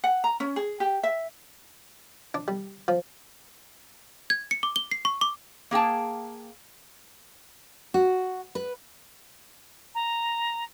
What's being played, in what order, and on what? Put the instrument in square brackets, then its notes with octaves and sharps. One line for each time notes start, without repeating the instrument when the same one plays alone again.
[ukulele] F#5
A#5
C#4
G#4
G4
E5
[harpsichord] D4
G3
F3
[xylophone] G#6
C#7
D6
G7
C7
C#6
D6
[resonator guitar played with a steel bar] A#3 G#4 G5 A5
[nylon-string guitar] F#4
B4
[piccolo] A#5